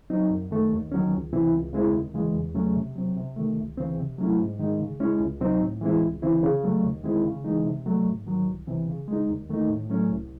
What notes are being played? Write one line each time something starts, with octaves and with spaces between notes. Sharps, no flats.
F#3 C4 D#4
F#2
D#3 A3
D#2
D#3 F#3 C#4
C#2
C3 E3 C4 E4
C#2
C#3 G#3 C4 E4
D#2
C#3 E3 G#3
E2
C#3 F#3 A3 C#4
C3
F#3 C4
C3
D#3 A3
C#2
C#3 E3 C4
C3
F#3 A3 C#4 E4
G#2
D#3 G#3 D#4
C#3
G#3 C#4 E4
C#2
C3 F#3 C4 D#4
A2
E3 G#3 C4 E4
C#2
C#3 E3 C4 E4
C#3
F#3 A3
D#2
D#3 G#3 C4 E4
C#3
E3 G#3 D#4
C3
F#3 A3
G#2
D#3 F#3
C2
C3 E3 C4
C#3
G#3
D#4
D#2
D#3 A3 D#4
A2
F#3 A3 C#4
C2